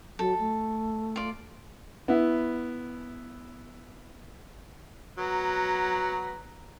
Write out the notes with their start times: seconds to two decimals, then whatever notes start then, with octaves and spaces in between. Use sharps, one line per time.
0.19 F#3 A4
0.39 A3
1.16 F4 D5
2.08 B3 E4
5.18 F#3 B3 A#5